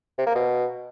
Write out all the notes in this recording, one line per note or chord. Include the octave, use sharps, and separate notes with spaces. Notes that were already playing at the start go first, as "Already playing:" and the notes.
C3
A#3
B2